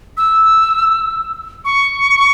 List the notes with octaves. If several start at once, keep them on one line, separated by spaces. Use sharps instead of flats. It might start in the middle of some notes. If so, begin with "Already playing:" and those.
E6
C#6